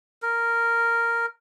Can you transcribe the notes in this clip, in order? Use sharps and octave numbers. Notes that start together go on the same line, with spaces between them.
A#4